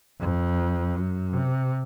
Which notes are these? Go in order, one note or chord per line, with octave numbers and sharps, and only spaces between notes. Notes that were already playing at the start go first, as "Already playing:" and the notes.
F2
F#2
C3